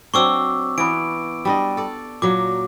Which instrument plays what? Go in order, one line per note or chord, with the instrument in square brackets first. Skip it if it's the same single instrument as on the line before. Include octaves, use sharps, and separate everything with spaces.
[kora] F#3 C4 D4 [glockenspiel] C#6 D6 E6
[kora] E3 B3 [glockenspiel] D7
[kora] G3 D4 D#5
A4 D5
[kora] A#2 F#3 A#3 [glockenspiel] D6